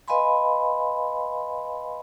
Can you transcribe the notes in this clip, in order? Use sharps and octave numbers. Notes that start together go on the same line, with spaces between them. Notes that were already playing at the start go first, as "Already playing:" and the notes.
B4 D#5 F5 G#5 B5 C6